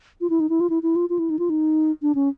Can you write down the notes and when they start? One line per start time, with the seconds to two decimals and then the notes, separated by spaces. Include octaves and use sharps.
0.21 F4
0.30 E4
0.40 D#4
0.49 E4
0.60 F4
0.70 E4
0.83 E4
0.96 F4
1.09 F4
1.19 E4
1.30 D#4
1.39 F4
1.50 D#4
2.02 D4
2.15 C#4